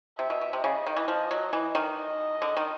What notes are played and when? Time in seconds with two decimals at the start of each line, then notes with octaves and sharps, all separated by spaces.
0.19 C3 E5
0.30 B2
0.41 B2
0.53 C3
0.64 C#3 D#5
0.87 D#3
0.97 E3
1.08 F3
1.31 F#3
1.53 E3
1.75 D#3
1.97 D#5
2.42 D3
2.57 D#3